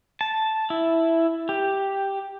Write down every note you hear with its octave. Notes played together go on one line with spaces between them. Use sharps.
A5
E4
G4